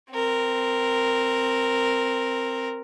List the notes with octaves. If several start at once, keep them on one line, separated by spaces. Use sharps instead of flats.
C4 A#4